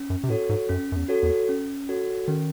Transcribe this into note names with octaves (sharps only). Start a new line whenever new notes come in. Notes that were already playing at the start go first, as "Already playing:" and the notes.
Already playing: C#4
F#2
C3
A2 F#4 A4 C#5
G#2
F#2 C#4
F#2
E2
F#4 A4 C#5
E2
C#4
F#4 A4 C#5
D#3 C#4